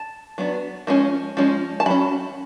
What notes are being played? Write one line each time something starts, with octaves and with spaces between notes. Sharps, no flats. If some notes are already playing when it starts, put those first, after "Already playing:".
Already playing: A5
F#3 B3 D4
F3 G#3 C#4
F3 G#3 C#4
A5
F#3 C#4 B5